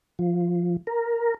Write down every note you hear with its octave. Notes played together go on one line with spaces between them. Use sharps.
F3
A#4